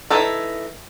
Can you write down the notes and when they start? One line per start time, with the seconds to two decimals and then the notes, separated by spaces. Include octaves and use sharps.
0.10 E3 D#4 A4